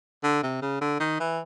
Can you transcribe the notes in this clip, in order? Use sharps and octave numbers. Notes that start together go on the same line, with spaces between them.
D3
C3
C#3
D3
D#3
E3